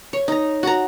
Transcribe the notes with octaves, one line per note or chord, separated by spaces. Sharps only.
C#5
D#4 A#5
F#4 F#5 A#5